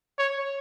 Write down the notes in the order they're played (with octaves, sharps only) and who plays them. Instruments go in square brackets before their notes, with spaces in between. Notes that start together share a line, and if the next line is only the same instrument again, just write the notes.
[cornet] C#5